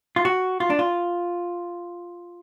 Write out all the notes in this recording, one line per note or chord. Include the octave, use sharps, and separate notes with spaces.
F4
F#4
F4
D4
F4